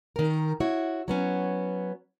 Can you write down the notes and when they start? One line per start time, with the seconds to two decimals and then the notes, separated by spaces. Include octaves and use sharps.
0.16 D#3 A#4
0.60 E4 F#4 C#5
1.08 F#3 B3 C#4